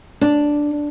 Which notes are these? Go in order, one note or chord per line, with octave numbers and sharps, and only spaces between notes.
D4